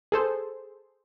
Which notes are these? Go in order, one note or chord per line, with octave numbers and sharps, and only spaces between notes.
G#4 A4 C5